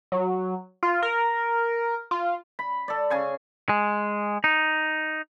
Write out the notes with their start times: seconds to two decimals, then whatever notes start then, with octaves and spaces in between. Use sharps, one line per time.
0.12 F#3
0.83 F4
1.03 A#4
2.11 F4
2.59 B5
2.88 A4 D5
3.10 C#3 G#5 C#6
3.69 G#3
4.44 D#4